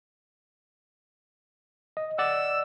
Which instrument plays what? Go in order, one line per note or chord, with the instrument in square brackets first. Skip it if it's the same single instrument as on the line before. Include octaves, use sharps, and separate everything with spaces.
[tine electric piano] D#5
[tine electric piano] D5 D#5 F#5 [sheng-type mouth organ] E6